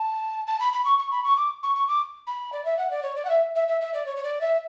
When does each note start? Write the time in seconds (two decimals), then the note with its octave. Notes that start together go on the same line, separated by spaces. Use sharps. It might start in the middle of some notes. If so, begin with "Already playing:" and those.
Already playing: A5
0.47 A5
0.60 B5
0.73 B5
0.85 C#6
0.98 C#6
1.12 B5
1.24 C#6
1.37 D6
1.63 C#6
1.75 C#6
1.88 D6
2.27 B5
2.52 D5
2.65 E5
2.78 F#5
2.91 D5
3.03 C#5
3.16 D5
3.25 F#5
3.30 E5
3.55 E5
3.68 E5
3.81 E5
3.94 D5
4.06 C#5
4.16 C#5
4.23 D5
4.41 E5